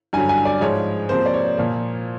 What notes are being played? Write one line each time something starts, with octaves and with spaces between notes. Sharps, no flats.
G2 D3 F#3 G#5
G#5
D5
G#2 F3 G#3 C#5
C3 F3 A#3 C5
D5
C#5
A#2 F3 A#3